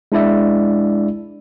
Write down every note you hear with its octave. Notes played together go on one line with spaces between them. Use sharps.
G#3 D4 E4 D5 E5